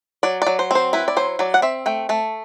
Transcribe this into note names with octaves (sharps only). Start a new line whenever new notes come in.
F#3 D5
F#3 D5
C5
C4 C5
E4 B4
D5
F#3 C5
F#3 D5
F#5
C4 E5
A3 G5
A3 A5